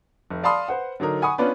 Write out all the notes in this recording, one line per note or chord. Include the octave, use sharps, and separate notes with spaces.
F1
D5 F5 A5 B5 C6 D#6
B4 C5 F#5
D3 F#3 D#4 A#4
F#5 G#5 B5 C#6 D#6
B3 C#4 D4 F4 B4